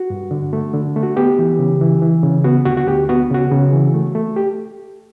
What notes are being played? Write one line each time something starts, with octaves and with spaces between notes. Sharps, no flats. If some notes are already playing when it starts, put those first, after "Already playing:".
Already playing: F#4
G2
D3
A3
D3
A3
F#4
B3 G4
E3
C#3
E3
E3
C#3
B3 F#4
D2 F#4
F#4
D2 G4
B3 F#4
C#3 F#4
C#3
E3
A3
A3
G4